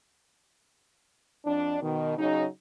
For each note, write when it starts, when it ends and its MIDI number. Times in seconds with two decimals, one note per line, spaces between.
1.46 1.78 41
1.46 1.78 62
1.82 2.17 47
1.82 2.17 51
2.18 2.45 49
2.18 2.45 54
2.18 2.45 63